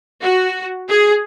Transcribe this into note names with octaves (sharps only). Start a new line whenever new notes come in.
F#4
G#4